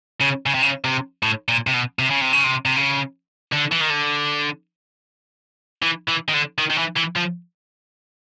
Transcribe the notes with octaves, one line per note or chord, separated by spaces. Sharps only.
C#3
C#3
C3
C#3
C3
A2
A#2
C3
B2
C3
C#3
C3
C#3
C3
C3
C#3
D3
E3
D#3
D3
E3
E3
D#3
D3
D#3
D#3
E3
E3
F3